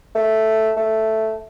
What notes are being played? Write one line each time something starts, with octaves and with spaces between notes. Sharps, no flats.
A3
A3